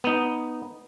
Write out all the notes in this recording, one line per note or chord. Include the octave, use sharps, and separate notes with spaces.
B3 D#4